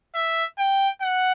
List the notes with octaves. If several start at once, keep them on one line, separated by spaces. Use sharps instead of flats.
E5
G5
F#5